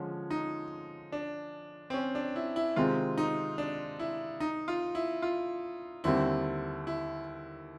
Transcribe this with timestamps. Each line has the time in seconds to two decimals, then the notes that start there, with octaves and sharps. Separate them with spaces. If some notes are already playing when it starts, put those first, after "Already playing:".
Already playing: D3 F3 G#3 C#4
0.31 D#4
1.12 D4
1.90 C4
1.94 C#4
2.15 D4
2.36 E4
2.56 E4
2.76 C3 D#3 G#3 C4 F4
3.18 D#4
3.58 D4
3.99 E4
4.40 D#4
4.68 F4
4.95 E4
5.22 F4
6.04 D#2 D3 G3 C4 E4
6.87 E4